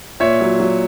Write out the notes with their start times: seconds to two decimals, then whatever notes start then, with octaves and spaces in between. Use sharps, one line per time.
0.20 A#2 C#5 E5
0.41 F#3
0.60 F#3